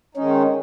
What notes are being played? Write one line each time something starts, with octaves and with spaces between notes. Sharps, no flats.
D#3 G#3 C#4 D#4